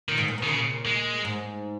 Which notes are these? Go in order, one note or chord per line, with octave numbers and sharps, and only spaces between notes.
A#2 D#3
G#2
A#2
B2
D#3
A#2 C#3
G#3
G#2